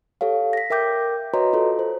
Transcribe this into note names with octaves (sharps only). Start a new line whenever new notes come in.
G4 A4 C#5 F5
A#6 B6
A#4 E5 G5 D6 G6
F#4 B4 C#5 D#5 A#5 C6
F4 A4
C5